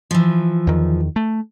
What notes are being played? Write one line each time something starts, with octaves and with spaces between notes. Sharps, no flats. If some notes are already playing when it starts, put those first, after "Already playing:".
E3 F3
E2 D#3
A3